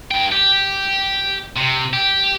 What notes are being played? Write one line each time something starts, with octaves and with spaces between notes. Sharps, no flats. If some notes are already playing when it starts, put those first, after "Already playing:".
G2 G5
G4
C3
G4